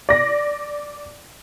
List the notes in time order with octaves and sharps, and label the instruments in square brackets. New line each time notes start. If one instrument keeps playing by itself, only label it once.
[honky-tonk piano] D5 A#6